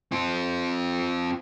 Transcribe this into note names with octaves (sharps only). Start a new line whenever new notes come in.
C4 F4